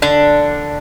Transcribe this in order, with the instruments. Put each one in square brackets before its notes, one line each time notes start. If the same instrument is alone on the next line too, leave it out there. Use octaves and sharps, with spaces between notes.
[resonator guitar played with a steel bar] D3 D4